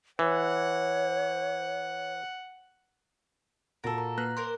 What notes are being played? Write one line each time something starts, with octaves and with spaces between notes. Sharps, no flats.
E3 C#5 F#5
A#2 F#4 A4 A#4 A6
A#5
A#3 B4 F#6 A#6
A#3 A#4 C5 C6